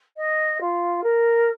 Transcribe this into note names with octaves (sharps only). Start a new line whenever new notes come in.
D#5
F4
A#4